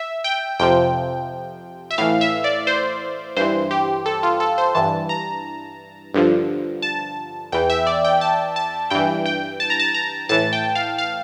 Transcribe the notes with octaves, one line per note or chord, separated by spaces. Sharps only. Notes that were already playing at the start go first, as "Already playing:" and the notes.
Already playing: E5
G5
F2 C3 F3 G5
E5
A2 E3 F5
E5
D5
C5
G2 E3 C5
G4
A4
F4
A4
C5
G2 E3 A5
A#5
G2 D3 F3
A5
E2 E3 G5
E5
D5
G5
A5
A5
G2 E3 G5
G5
A5
A#5
A5
A#5
A2 E3 A5
G5
F5
F5